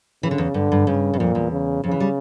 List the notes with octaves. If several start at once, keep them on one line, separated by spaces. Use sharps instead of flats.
C#3 E3
D3
E2
G2 D3
G2
G2 C#3
G2
F2 A#2
E2
C#3
F2 C#3
E3
G3